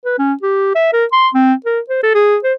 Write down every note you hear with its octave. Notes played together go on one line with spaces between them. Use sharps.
B4
C#4
G4
E5
A#4
C6
C4
A#4
C5
A4
G#4
C5